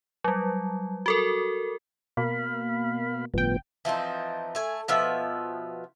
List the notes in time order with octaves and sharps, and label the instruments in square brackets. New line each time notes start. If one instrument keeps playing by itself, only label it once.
[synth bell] F#3 G3
F#4 A4 A#4
[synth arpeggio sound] B2 A#3 [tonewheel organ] F5 B5
[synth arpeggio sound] G1 G5 [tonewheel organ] A2 F3 B3
[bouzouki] E3 F3 C4 D#4
A3 G#5
B2 F3 B3 E5